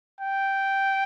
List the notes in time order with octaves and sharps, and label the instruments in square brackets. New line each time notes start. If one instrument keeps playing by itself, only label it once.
[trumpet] G5